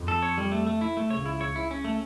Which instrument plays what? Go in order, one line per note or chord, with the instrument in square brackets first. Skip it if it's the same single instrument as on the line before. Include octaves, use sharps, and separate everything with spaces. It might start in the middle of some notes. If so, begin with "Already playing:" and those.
Already playing: [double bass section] F2
[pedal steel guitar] A4
C#5
G3
A3
A3
E4
A3
[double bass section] C#2 C#3 [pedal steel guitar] C#5
[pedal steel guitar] E4
C#5
E4
C#4
A3